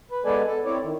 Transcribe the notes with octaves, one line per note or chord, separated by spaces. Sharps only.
B4
G#3 B3 A4 B4 D5 G#5
A4
C4 E4 C#5 D5
D#3